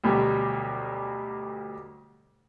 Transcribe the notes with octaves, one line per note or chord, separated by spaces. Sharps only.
D2 B2 F#3 G3